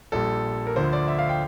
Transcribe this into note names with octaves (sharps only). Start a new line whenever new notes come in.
A#1 A#2 G3 A4
A#4
D2 D3 F3 C5
D5
E5
F5
G5